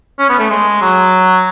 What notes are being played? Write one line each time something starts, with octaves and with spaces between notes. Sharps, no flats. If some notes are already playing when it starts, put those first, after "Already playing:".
C#4
B3
A3
G#3
F#3